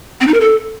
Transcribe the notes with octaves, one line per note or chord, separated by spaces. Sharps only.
C4
D#4
A#4
A4